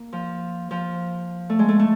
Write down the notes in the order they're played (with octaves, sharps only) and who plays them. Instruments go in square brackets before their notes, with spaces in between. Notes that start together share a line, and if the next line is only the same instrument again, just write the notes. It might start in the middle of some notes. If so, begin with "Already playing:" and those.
Already playing: [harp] A#3
F3
F3
A3
G#3
A3
A3